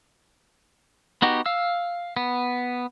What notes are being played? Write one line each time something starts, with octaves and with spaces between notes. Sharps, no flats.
B3 D#4 F#4 G4
F5 E6
B3